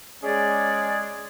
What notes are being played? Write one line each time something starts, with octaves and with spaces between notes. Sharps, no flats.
G#3 C#4 G#4 D5